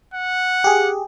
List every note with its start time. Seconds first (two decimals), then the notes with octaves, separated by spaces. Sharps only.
0.14 F#5
0.64 G4 G#4